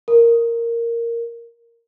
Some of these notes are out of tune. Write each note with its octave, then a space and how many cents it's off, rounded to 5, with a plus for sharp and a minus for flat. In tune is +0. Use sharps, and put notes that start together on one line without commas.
A#4 -5